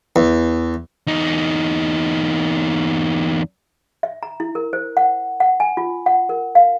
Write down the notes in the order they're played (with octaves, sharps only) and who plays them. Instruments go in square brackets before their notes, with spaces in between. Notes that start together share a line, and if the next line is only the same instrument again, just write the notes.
[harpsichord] E2
[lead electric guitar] E2 D#4
[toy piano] E5
A#5
E4
A#4
C5
F#5
F#5
G#5
F4
F#5
A#4
F5